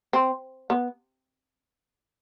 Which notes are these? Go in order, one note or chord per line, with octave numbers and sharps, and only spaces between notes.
C4
B3